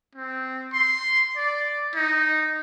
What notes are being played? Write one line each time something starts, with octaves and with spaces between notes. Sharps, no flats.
C4
C6
D5
D#4